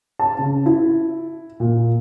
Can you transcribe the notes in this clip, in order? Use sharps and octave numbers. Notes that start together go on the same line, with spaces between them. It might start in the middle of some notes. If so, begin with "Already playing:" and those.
A5
C#3
E4
A#2